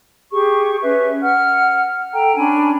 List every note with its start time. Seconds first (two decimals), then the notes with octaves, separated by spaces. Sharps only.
0.32 G4 G#4 C#6
0.82 C#4 B4 E5
1.21 F#5 F6
2.13 A4 G5 A#5
2.35 C#4 D4 G#5 B5